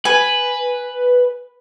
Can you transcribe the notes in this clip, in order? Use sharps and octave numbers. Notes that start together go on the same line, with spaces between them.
B4 G#5